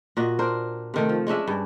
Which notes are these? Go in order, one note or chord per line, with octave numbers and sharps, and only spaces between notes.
A#2 F#4 D#5
D4 A#4 C5
C3 D#3 A3
F3
G#3 C#4 D4 E5
G2